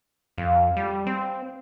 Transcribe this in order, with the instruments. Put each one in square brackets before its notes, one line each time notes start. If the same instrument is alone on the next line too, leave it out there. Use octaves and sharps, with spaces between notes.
[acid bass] F2 [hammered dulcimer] F5
[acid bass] G3
C4